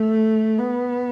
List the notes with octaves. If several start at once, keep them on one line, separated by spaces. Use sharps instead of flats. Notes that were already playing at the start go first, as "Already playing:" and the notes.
Already playing: A3
B3